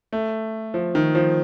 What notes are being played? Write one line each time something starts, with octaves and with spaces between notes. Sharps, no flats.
A3
F3
D#3
F3